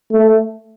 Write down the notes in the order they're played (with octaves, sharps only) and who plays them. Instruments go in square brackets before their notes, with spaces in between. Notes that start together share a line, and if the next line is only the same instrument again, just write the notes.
[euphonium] A3